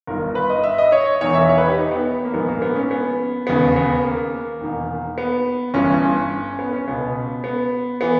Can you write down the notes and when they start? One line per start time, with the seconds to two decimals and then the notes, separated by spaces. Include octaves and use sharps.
0.07 G1 G2 D#3 A#4
0.35 B4
0.50 D#5
0.63 E5
0.78 D#5
0.92 C#5
1.20 E1 E2 D#3 C#5
1.35 E5
1.49 C#5
1.58 B4
1.68 G4
1.77 D#4
1.91 B3
2.25 A#3
2.34 A#1 G#2 D#3 B3
2.49 A#3
2.62 B3
2.76 C#4
2.91 B3
3.47 E1 D#2 C#3 B3
3.76 B3
4.03 A#3
4.61 E1 E2 D#3
5.18 B3
5.74 G1 G2 E3 C#4
6.59 B3
6.73 C#4
6.87 C#2 B2 B3
7.44 B3
8.01 E3 B3